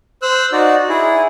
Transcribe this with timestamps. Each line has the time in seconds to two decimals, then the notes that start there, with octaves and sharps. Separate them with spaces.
0.22 C5 E6 F#6
0.52 D#4 F#4 D5
0.89 E4 G#4